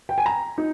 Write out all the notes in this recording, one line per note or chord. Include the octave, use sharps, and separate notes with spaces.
G5
G#5
A#5
D#4